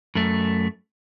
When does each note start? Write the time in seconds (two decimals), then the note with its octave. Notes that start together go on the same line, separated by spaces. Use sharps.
0.15 F#2 A3